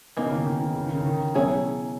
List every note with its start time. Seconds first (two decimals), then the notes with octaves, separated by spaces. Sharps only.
0.17 B2 E3 A#3 D#4
0.26 C#3
0.32 D#3
0.47 D#3
0.62 D#3
0.75 C#3
0.86 D#3
0.95 C#3
1.06 D#3
1.34 B2 F#3 C#4 E4 G#4 C#5